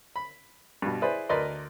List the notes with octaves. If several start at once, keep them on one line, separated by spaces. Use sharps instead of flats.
B5
G2 B2
E4 G#4 B4 C5 D5
D2 A#4 B4 D5 D#5 C6